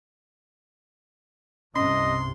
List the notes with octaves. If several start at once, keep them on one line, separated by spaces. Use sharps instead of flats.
C2 G2 C3 C#4 D#5 C6